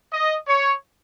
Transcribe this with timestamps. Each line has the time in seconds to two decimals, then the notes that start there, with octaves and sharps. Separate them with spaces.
0.13 D#5
0.48 C#5